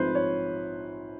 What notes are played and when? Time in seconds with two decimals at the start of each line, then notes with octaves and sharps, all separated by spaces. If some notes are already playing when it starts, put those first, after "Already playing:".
Already playing: A#1 G#2 F3 A3 C4 B4 C5
0.15 C#5